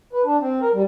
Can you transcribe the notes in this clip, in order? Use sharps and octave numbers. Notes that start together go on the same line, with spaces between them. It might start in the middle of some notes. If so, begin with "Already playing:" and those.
B4
D4
C4
A#4
G3